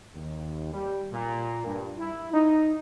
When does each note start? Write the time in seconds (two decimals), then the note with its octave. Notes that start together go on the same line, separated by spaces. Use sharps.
0.15 D#2
0.73 G3
1.13 A#2
1.67 G2
1.99 E4
2.34 D#4